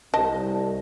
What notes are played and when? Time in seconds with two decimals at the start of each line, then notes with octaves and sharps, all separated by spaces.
0.14 C2 D#5 A5